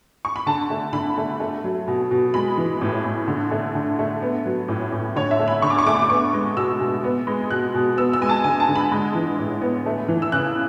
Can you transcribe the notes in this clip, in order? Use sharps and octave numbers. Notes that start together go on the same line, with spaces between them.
C#6
B5
D3 A5
A3
D3 B5
A3
A3
F#3
B2
B2
G#3 B5
E3
A2
A2
D3
A3
D3
A3
B3
F#3
A2
A2
D3 C#5
E5
A3
B5
D3 C#6
D6
C#6
A3 D6
C#6
D6
B3 C#6
G#3
B2 E6
B2
B3
G#3
B2 F#6
B2
B3 E6
E6
G#3 G#5
A5
D3 G#5
A5
D3
B5
G#3
E3
A2
B3
A3
E3
E6
C#3 F#6